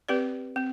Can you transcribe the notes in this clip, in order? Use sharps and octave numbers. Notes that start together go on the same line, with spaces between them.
C4 G4 B4 D5
C4